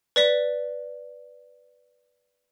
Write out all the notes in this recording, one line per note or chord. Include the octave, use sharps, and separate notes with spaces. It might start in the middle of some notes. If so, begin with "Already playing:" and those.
B4 D5 B6